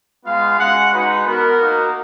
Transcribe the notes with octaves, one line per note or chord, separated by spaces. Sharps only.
G#3 B3 F4 F5
G#3 C#4 F#4 F#5
G#3 D#4 F#4 B4
B3 F#4 A#4
A#3 D#4 F#4